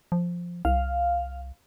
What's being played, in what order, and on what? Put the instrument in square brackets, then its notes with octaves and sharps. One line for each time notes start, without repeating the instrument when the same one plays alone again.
[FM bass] F3
[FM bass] C2 [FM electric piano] F5